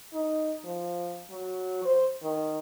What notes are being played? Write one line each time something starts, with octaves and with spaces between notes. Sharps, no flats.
D#4
F3
F#3
C5
D#3